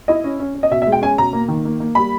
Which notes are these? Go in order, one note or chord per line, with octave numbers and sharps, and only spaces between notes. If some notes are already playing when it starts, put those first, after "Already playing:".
E4 D#5
C#4
C#4
C#4
D#5
B2 E5
E5
G#3
G5
C#4 G#5
B2 A#5
A#3
D#3
A#3
A#3
G3 B5